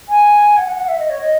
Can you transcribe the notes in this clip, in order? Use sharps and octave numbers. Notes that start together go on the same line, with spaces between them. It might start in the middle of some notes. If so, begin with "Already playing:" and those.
G#5
F#5
F#5
F#5
E5
D#5
C#5
D#5